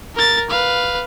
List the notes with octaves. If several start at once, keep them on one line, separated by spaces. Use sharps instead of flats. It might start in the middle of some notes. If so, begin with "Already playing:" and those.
A#4 A6
B4 F5